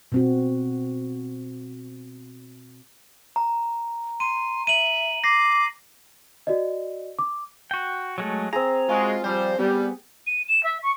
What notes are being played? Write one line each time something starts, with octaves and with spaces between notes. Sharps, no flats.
B2 C4 F#4
A#5
C6 D#7
E5 D#7 F#7
D6 A#6 C7
F#4 D5 D#5
D6
F#4 G5
F#3 G#3 A3
C4 G#4 A#5
G#3 F4 F#4
F3 G3 C5
G3 B3
D#7
E7
E5
C#6